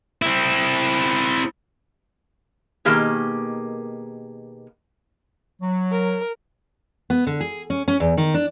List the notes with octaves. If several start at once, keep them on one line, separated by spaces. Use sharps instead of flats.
C4 E4
B2 D#3 A#3 G4 G#4
F#3
A#4
B3
D3
G#4
C#4
C#4
E2
D#3
D4